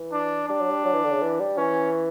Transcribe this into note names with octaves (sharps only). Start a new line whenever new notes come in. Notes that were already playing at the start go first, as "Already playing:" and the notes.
Already playing: E3
D4
G3 D4
F#3
G3
F#3
E3
D3
C#3
E3
G3
E3 C#4